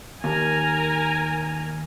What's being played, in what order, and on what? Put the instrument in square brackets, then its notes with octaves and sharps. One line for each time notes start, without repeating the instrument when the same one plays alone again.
[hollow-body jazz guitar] D#2 [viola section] A#4 G#5 A#5